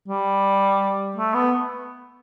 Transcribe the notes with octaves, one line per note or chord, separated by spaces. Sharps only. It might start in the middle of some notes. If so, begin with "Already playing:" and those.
G3
A3
B3